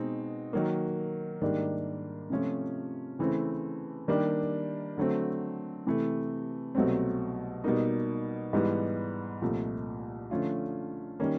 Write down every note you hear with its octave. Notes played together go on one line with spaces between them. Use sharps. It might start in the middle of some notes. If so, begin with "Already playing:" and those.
Already playing: B2 G#3 C4 D#4
D#3 F#3 A#3
G#2 D#3 G3 A#3 D4
C3 F3 A3 C#4 F4
C#3 E3 A3 C4
D#3 G3 A#3 D4 G4
D3 F#3 A3 C4
C3 E3 A3
C2 B2 F#3 A3 C4
B2 G3 A#3 D#4
G#2 E3 G3 B3
C2 A#2 F3 A3
D3 F3 A3 C#4 F4
D#3 G3 A#3 C#4